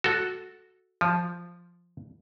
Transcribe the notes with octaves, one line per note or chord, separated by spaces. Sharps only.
F#4 A4
F3